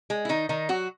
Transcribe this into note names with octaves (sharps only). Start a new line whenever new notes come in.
G#3
E4
D#3 D#4
D#3 D#4
F#3 F#4